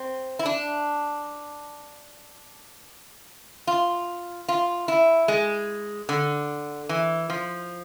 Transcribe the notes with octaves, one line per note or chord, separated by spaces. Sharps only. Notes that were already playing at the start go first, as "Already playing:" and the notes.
Already playing: C4
E4
D4
F4
F4
E4
G#3
D3
E3
F3